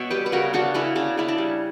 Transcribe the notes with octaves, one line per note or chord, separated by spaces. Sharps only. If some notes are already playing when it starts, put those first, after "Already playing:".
Already playing: B2 C#5 E5
G3 G4 B4
B4
C#3 F#4 A#4
C#3 D4 F#4
C#3 C#4 E4
C#3 D4
C#3 E4
D4
G3